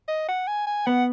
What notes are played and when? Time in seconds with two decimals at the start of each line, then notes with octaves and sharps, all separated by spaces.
0.08 D#5
0.28 F#5
0.47 G#5
0.67 G#5
0.86 B3 F#5